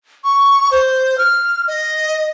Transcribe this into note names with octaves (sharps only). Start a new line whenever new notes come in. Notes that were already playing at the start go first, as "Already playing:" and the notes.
C#6
C5
F6
D#5